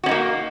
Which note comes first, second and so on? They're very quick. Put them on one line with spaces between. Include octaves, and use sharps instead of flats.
F#4 C#4 D#4 A#3